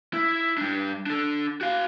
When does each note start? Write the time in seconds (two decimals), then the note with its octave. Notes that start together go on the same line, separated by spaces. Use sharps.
0.13 E4
0.58 G3 D4
1.06 D4 A4
1.61 F#4 F5